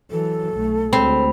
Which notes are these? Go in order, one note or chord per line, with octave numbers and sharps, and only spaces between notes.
E3 F#3 A4
B1 A3
D2 G#3 C4 B5